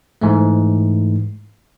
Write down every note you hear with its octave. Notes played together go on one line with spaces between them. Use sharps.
G#2 E3 A3